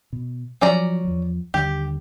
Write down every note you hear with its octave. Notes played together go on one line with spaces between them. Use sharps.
B2
F3 F#3 C#4 D5 A#5
E2 F3
D#2 D3 G3 G4